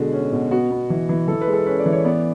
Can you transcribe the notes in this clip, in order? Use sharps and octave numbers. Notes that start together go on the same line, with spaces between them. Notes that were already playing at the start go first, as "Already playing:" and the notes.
Already playing: B2 D3 G#3 F#4
C#4
B2
B3 F#4
B3
E3
E3
E3 A4
B4
G#3
A4
C#4 B4
D5
E3
C#5
B3 D5